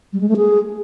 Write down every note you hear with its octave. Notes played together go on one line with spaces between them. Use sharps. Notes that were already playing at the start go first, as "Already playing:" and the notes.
G3
G#3
A3
G#4